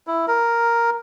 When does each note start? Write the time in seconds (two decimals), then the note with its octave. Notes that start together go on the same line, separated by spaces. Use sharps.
0.07 E4
0.28 A#4